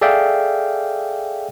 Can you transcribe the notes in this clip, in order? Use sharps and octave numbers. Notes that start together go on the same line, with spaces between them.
G#4 A4 D5 E5 F5 G5